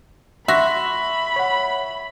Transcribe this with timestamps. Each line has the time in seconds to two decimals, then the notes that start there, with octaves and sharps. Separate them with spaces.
0.48 F#4 E5 B5 C6 A#6
1.36 C#5 F#5